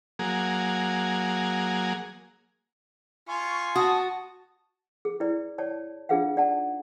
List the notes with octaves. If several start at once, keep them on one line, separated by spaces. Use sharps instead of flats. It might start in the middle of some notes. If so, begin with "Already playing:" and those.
F#3 A#3 G#4
F4 G#5 C#6
F#4 A5 D#6
G#4
E4 B4 D5
C#5 D5 A5
D4 F4 G#4 B4 F5 F#5
D#4 D5 F#5 A5